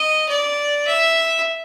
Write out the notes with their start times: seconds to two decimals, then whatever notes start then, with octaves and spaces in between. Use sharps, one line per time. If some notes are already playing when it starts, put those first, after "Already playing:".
Already playing: D#5
0.29 D5
0.87 E5